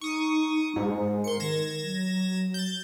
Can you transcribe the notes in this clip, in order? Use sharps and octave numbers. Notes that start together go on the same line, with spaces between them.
D#4 C#6 D#6
G#2 G#3
A#4 C6 C#7
D#3 G#6 A#6 E7
F#3
G6 A6